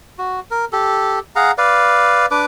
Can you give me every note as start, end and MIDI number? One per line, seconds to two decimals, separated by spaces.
0.18 0.40 66
0.51 0.65 70
0.73 1.19 67
0.73 1.19 69
1.36 1.51 68
1.36 1.51 77
1.36 1.51 78
1.36 1.51 82
1.58 2.26 71
1.58 2.26 74
1.58 2.26 77
2.31 2.45 62
2.31 2.45 71
2.31 2.45 86